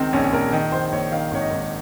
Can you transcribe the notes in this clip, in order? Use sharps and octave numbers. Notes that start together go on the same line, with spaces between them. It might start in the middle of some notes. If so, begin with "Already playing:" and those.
Already playing: C#2 D#3 C4
A#1 C#4
A#1 A#4
D#3
A#1 C5
A#1 C#5
D#3 F5
G#1 C#5
D#5
G#1